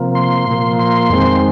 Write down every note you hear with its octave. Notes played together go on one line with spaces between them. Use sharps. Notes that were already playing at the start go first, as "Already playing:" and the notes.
Already playing: C3 F3 A#3
C6
A#2 F3 A#3
C6
F2 D#3 G#3 C4